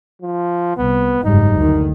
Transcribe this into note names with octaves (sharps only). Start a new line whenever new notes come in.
F3
C2 B3
F#1 G#2 G3 D#4
D2 D#3